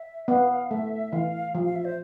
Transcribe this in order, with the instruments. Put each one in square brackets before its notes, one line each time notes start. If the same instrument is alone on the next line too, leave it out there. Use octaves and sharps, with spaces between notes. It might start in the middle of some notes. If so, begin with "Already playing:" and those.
Already playing: [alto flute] E5
[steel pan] B3 [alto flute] F5
[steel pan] A3 [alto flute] E5
[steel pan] E3 [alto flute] F5
[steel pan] F3
[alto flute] F5
E5
C5